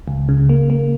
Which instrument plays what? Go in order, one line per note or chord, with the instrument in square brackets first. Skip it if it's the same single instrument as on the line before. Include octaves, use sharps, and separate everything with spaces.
[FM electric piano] C#2
C#3
A#3
A#3